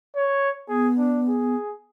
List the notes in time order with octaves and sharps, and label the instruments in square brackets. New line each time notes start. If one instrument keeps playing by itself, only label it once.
[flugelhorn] C#5
[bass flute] B3 [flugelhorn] G#4
[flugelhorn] D4
G#4